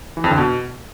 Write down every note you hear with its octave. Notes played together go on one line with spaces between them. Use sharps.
E3
F2
D3
B2